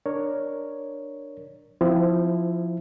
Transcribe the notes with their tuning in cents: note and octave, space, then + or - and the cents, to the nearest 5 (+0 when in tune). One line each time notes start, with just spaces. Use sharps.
D4 +10 A#4 +0 C#5 +0
F3 +0 C4 -20 E4 +0